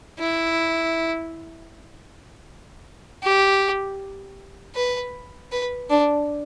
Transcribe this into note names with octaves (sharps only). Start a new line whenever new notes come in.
E4
G4
B4
B4
D4